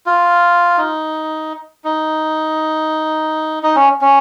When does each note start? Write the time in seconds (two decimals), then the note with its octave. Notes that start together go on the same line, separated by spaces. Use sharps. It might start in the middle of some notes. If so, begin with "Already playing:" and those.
0.06 F4
0.78 D#4
1.84 D#4
3.63 D#4
3.76 C#4
4.01 C#4